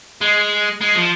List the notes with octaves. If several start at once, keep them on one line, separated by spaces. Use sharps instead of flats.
G#3
G#3
F3